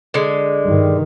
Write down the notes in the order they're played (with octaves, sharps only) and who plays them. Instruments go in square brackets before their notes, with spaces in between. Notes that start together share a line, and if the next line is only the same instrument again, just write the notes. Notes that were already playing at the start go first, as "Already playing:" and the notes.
[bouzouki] D3 G#3
[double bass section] G2 D#3